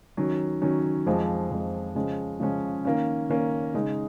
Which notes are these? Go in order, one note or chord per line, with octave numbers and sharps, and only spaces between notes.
D#3 F#3 C#4
D#3 F#3 C#4
F2 F3 G#3
F2 F3 G#3
C#3 F3 G#3 C#4
C#3 F3 G#3 C#4
D#3 A#3 C#4
D#3 A#3 C#4
C#3 G#3 D#4